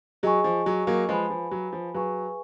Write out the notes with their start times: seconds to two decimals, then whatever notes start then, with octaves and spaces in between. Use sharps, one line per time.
0.23 F#3 G#4 D#5 G#5 C#6
0.44 F3
0.66 F#3
0.87 F#3 A#3
1.08 F3 G#3 B4 F5 G#5 B5
1.30 F3
1.51 F#3
1.73 F3
1.94 F#3 G#4 B4 F5 G#5 C#6